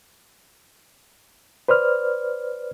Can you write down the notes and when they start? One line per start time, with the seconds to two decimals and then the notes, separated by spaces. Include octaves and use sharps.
1.68 B4 C5 D5 F6